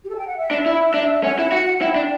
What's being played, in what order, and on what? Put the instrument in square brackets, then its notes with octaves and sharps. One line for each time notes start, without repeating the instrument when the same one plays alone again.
[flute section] G4
A4
A5
G5
F#5
E5
[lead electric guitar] D4
E4
D4
[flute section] E5
[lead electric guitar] C#4 [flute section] F#5
[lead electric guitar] E4
F#4
[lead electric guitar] E4 [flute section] G5
[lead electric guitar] D4